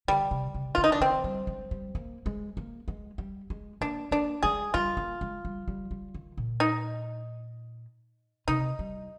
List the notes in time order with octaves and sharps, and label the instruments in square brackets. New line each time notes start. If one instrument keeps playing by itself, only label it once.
[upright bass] D3 [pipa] G3
[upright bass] C3
C3
[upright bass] D3 [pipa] F4
[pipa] D#4
D4
[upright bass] D#3 [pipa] C4
[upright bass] G3
G#3
G3
A#3
G#3
A#3
G#3
G3
G#3
[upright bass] A#3 [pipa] D4
[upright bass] A#3 [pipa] D4
[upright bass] G#3 [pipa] G#4
[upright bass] G3 [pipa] F4
[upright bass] A#3
G#3
G3
G3
G3
D#3
A#2
[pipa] D#4
[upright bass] C3 [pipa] D#4
[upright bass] G3